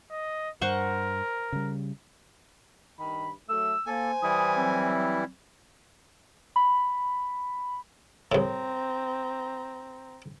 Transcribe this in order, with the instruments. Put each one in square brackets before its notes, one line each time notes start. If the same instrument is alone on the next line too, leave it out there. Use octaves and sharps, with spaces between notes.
[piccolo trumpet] D#5
[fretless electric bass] G2 [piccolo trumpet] A#4 [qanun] C5 F#5 C#6
[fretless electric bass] C#3 G3
[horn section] G2 D#3 B5
[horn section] F#3 A3 [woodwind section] E6
[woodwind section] A#3 [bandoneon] A4 [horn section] C5 G#5
[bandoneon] E3 G3 E4 [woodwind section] D#6
[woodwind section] F#3 C4
[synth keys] B5
[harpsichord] C2 A2 [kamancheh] C4 A#5